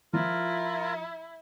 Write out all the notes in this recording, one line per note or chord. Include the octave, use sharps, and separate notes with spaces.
F3 E4 F4 A#4